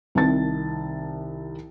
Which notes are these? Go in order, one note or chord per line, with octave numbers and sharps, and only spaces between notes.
C2 C3 D#3 A5 A6